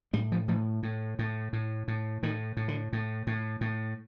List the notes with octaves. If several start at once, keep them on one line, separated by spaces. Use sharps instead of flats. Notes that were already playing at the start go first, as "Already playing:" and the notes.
A2 G3
F3
A2 F3
A2
A2
A2
A2
A2 D#3
A2
D3
A2
A2
A2